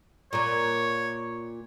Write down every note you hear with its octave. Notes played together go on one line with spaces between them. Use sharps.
A#2 A#3 C#5